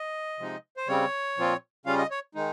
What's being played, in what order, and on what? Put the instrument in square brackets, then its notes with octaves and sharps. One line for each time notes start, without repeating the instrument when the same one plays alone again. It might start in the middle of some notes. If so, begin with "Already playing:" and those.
Already playing: [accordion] D#5
C3 F3 G#3 D#4
C5
C#3 G3 C4 C#5
A#2 F3 C4 F4
C#3 G3 C#4 F4 F5
D#5
C#5
D#3 G#3 D#4